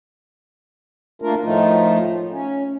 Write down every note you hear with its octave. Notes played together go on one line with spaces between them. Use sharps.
A3 A#3 D4 F4 A#4
A2 D#3 F3 A3 D#4 F4
C#4